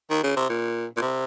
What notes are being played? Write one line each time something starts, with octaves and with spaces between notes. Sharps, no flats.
D#3
C#3
C3
A#2
A#2
C3